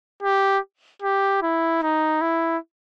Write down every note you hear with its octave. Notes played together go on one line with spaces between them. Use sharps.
G4
G4
E4
D#4
E4